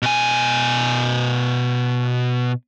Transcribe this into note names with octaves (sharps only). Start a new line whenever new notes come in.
B2 G#5